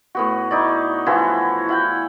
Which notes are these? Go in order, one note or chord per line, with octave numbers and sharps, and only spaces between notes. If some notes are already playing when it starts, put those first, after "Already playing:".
A2 B3 F#4
D#4 E4 D5
E3 F3 E4 F#4
E4 F#5 G5